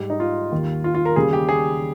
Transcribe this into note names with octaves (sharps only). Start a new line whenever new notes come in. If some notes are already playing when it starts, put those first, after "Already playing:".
Already playing: G#2 G3
D#4
F4
D#2 D#3 G3
F4
F4
A#4
D#2 C#3 G3 G#4
G4
G#4